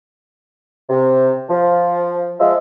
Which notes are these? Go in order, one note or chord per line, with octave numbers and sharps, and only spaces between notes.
C3
F3
F3 G#3 E5